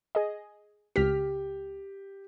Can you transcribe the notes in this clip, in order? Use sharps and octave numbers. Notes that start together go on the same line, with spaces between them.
G#4 D#5
C#2 G4 F6 B6